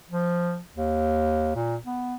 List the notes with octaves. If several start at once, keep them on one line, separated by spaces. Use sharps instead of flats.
F3
D#2
A#2
B3